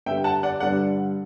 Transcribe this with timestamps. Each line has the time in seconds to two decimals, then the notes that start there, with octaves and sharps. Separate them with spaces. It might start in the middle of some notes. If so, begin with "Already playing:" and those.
0.06 G2 D3 G3 E5 G5
0.24 F#5 A5
0.43 D5 F#5
0.60 G2 D3 G3 D5 F#5